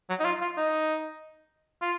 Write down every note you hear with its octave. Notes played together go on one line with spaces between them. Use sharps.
F#3
D#4
F4
F4
D#4
F4